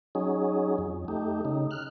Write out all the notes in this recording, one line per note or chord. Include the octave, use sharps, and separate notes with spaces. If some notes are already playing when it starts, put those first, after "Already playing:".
F#3 C#4 D#4 G#4
F2
A3 D#4 G4
C#3 D#4
F6 F#6